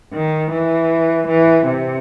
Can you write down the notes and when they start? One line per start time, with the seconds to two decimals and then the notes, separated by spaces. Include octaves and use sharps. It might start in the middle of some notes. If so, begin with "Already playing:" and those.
0.13 D#3
0.52 E3
1.28 E3
1.67 C3